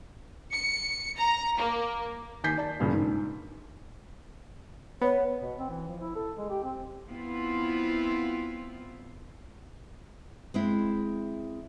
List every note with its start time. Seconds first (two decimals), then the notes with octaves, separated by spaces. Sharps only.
0.52 C#7
1.17 A#5
1.58 A#3
2.44 D#2 G#5 G6 B6 C7
2.58 D5 A5
2.80 E1 G2 A#2 C#3
2.93 G#2
5.01 B3 C#5
5.42 B2
5.59 C4
5.71 E3
5.88 F3
6.01 E4
6.16 A4
6.38 G#3
6.50 G4
6.64 C4
7.09 B3 C4 E4 F4
10.54 G#3 C4 E4